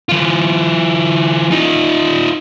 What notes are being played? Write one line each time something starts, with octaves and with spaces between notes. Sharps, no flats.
E3 F4
D#4 F4